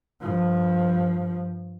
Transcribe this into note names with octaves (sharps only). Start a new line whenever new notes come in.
G2 F3